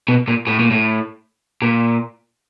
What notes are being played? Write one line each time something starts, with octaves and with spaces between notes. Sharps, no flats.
B2
A#2
A2
A#2
A2
A#2